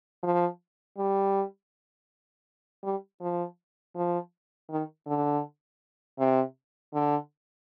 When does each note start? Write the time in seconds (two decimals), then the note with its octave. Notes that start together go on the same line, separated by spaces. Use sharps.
0.23 F3
0.98 G3
2.84 G3
3.21 F3
3.96 F3
4.70 D#3
5.07 D3
6.19 C3
6.94 D3